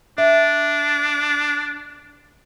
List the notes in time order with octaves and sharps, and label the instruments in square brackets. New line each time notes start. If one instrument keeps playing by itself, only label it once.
[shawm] D4 [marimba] E5